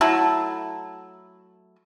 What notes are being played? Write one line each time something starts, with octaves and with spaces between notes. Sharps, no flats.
F#3 A3 E4 A4